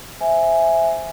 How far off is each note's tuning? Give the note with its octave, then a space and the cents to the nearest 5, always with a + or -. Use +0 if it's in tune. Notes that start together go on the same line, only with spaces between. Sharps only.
C5 +0 E5 +0 G#5 +0